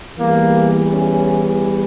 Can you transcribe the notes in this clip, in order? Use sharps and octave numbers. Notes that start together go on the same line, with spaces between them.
E2 E3 G3 A#3
C#4